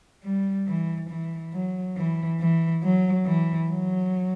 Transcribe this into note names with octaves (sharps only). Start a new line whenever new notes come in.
G3
E3
E3
F#3
E3
E3
F#3
E3
F#3